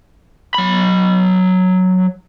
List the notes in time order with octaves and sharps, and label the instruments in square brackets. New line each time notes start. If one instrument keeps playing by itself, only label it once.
[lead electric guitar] F#3 B5